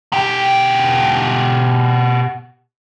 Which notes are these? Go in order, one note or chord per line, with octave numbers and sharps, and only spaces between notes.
B2 G4